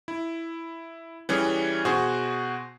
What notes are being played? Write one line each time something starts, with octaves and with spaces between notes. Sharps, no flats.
E4
E3 G3 C#4 G#4
B2 F#4 G#4 C5 C#6